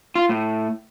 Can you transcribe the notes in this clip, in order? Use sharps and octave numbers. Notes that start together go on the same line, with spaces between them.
F4
A2